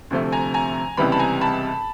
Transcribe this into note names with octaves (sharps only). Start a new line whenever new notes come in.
D2 C3 F3 A3
G#5 A#5
G#5 A#5
C#2 C3 E3 G3 B3 B5
A5 B5
G#5 A#5
A5 B5